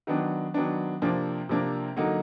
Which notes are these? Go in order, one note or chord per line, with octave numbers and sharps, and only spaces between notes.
D#3 F#3 B3 D4
D#3 F#3 B3 D4
C3 F3 A#3 D4
C3 F3 A#3 D4
D3 F#3 A#3 D#4 F#4